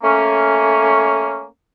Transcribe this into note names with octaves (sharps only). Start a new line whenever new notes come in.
A3 A#3 C#4